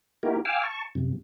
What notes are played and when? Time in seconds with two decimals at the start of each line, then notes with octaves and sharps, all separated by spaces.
0.23 A#3 D#4 E4 F#4 G4 A#4
0.45 F5 G5 G#5 D6 E6 F6
0.63 A5 C#6
0.95 F#2 C3